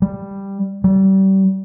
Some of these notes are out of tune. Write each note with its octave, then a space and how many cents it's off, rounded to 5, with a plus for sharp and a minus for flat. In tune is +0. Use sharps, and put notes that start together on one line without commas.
G3 +5
G3 -30